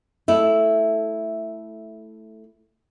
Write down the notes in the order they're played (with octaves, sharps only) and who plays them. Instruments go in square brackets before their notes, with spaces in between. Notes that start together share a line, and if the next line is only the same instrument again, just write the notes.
[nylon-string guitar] A3 E4